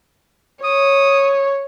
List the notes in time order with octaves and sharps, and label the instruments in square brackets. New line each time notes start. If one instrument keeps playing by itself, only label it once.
[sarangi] C#5 [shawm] D#6